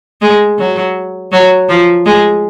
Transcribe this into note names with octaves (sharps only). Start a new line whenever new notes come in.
G#3
F#3
F#3
F3
G#3